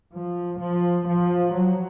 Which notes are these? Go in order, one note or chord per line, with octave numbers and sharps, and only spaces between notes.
F3
F3
F3
F#3